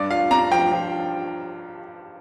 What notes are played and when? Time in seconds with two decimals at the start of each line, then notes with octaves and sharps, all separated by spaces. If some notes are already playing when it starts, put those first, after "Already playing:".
Already playing: G2 D5
0.10 F4 F5
0.31 D4 A#5
0.51 F3 G5
0.72 F3